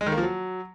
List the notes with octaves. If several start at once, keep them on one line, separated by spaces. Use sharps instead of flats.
G#3
D#3
A#3
F3
F#3